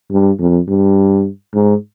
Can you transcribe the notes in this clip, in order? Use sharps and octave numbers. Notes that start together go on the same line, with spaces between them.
G2
F2
G2
G#2